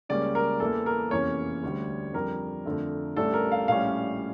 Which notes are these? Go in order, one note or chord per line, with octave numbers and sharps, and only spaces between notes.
C#2 C#3 G3 A#3 C#4 D5
A#4
E2 E3 A#3 E4 A4
A#4
F1 E2 E3 A#3 C#4 C#5
D2 D3 G3
F2 D3 G3 A#4
F2 D3 A3
A1 A2 G3 D4 A4
A#4
F5
A#1 A2 G3 C#4 F5